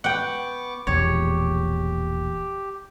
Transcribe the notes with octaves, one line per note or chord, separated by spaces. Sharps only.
B3 F#5 G5 C#6 D6
E1 A#1 E2 G4 C#5